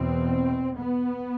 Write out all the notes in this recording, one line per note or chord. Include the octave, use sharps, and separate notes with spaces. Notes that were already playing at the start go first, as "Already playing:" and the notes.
Already playing: E2 B2 C4
B3